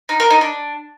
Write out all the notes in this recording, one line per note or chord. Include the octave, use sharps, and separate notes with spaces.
D#4
A#4
D#4
D4